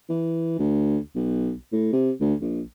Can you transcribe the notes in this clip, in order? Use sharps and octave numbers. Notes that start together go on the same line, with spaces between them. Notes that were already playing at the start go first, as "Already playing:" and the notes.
E3
D2
B1
A2
C3
D2
A#1